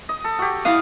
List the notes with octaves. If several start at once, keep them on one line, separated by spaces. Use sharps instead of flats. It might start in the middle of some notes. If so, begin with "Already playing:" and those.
D#5
A4
F#4 G4
E4 F5 D#6